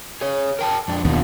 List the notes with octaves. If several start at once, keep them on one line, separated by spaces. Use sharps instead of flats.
G#4 C#5
A#4 G5 A5
F2 D4
D#2 B2 D3 F4